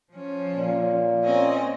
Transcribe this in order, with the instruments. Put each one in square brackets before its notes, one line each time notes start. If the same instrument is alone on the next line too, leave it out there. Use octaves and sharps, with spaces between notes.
[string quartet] F3 C#4
[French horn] A#2
[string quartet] C4 C#4 D#5